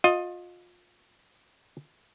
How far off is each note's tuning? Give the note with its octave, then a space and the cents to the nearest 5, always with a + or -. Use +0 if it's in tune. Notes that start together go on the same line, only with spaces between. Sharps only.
F4 +25 D#5 +0